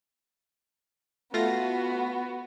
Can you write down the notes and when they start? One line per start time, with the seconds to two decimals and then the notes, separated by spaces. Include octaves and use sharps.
1.34 A3 B3 F4 F#4 A#6